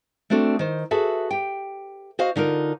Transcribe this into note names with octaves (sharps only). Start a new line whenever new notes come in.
A3 C4 D4 F#4 A4
D#3 C5
F#4 G#4 A4 B4 E5
G4 G5
F#4 C5 D#5 F5
D3 D#4 F4 A#4